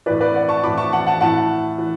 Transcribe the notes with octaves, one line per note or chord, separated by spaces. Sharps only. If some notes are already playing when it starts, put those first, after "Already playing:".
A2 E3 B4 D5
B4 D5
D5 F#5
A5 C#6
A2 E3 B5 D6
A5 C#6
F#5 A5
F#5 A5
A2 E3 F#5 A5
E3